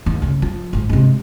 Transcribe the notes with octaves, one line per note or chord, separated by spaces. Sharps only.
D#2
C#3 A3
F3
G#1 G#2
C3 G#3